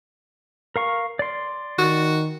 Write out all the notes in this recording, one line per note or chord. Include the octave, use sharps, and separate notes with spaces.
A#4 F5 C#6
D5 C6
D#3 F#4